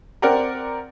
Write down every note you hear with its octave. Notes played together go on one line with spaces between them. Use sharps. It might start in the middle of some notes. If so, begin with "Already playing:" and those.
C4 A#4 D5 F#5 G5 A#5